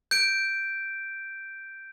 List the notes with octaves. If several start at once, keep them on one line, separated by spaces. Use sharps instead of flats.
G6 D7